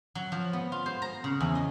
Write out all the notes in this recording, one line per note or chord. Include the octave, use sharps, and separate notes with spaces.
F#3
F3
B3
F4
C5
A#5
C#3
E2
D#5